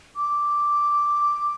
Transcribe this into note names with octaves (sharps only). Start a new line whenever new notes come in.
D6